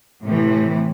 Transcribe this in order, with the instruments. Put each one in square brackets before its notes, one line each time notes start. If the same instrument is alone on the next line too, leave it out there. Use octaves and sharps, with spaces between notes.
[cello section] A2 C3 E3